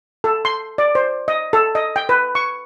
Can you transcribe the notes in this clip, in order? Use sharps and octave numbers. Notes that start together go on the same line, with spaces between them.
A4
C6
D5
C5
D#5
A4
D#5
G5
B4
C#6